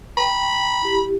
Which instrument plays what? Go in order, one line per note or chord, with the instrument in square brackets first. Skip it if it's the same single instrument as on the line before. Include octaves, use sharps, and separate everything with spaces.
[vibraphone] G5 [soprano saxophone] B5
[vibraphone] E4 G4